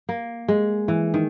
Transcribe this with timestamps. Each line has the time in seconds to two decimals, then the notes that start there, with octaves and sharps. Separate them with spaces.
0.09 A#3
0.48 G#3
0.88 E3
1.14 D#3